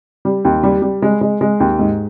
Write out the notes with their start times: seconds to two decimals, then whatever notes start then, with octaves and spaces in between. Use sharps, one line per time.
0.25 G3
0.45 D#2
0.63 G3
0.82 G3
1.02 G#3
1.21 G#3
1.41 G#3
1.60 D#2
1.79 G#2